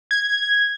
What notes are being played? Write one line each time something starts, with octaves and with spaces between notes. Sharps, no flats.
G#6